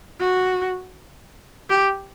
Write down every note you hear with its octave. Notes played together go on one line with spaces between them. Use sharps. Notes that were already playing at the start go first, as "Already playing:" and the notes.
F#4
G4